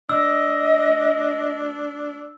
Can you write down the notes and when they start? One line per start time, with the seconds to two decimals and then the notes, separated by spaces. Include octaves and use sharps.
0.09 D4 D#5 E6